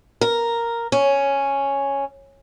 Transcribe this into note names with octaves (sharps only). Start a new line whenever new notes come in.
A#4
C#4